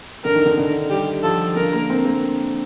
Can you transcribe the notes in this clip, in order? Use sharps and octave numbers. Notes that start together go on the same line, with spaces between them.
D3 A#4
D#3
D3
D3
G3 G4
F3 A4
D3 A#4
A#3
C4
A#3